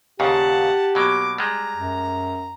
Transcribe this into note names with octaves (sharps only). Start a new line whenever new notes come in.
D#2 A#2 C#3 G4 F#5 A5
B2 F#3 A#3 D6
G3 G#3 A#5
F#2